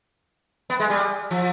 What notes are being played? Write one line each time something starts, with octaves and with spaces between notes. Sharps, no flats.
B3
G#3
G3
F3